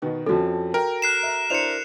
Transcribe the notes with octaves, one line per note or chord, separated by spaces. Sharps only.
B2 D#3 B3
F2 F3 C#4 F#4 A4
A#4 G5
F#6 C7 E7
E5
D4 E4 C5 C#7 F7